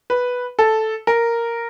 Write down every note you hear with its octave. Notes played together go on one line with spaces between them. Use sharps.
B4
A4
A#4